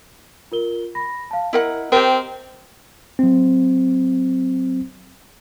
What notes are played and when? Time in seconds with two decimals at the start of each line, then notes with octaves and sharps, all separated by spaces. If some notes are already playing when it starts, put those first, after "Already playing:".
0.52 F4 A#4 G7
0.95 B5 A#6
1.31 F5 A5
1.53 E4 A#4 D#5 F#5
1.92 C4 G4 A#4
3.19 F#3 C4